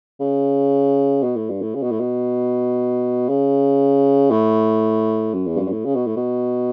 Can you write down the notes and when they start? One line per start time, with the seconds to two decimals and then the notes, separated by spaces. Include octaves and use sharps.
0.20 C#3
1.23 B2
1.36 A2
1.49 G2
1.62 A2
1.75 C#3
1.82 B2
1.91 A2
2.00 B2
3.29 C#3
4.31 A2
5.34 F#2
5.46 E2
5.56 G2
5.59 F#2
5.66 G2
5.72 A2
5.85 C#3
5.95 B2
6.06 A2
6.16 B2